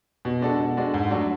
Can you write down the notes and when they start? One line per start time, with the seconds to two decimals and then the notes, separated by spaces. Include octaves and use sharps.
0.25 B2
0.42 G#3 D4 F#4 A4
0.59 B2
0.77 G#3 D4 F#4 A4
0.94 G#2
1.11 F#3 A3 D4 F#4